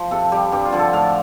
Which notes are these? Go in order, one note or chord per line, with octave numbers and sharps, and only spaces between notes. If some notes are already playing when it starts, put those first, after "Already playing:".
Already playing: F3 C5
C3 A4
G3 G4
G2 G4
F4
D3 F3
A4
A2 F5